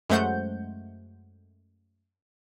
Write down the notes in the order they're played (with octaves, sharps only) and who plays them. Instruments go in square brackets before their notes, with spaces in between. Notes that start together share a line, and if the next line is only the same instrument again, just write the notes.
[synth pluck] F#2 G#3 A3 C5 F#5 G6